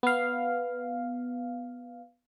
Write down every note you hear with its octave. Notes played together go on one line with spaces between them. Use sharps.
B3 F5